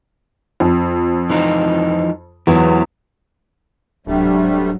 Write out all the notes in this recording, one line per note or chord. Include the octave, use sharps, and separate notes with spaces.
F2
E3 F3 D#4
E2 E3 F#3
D1 G#2 C3 F#3 G3 A3 D4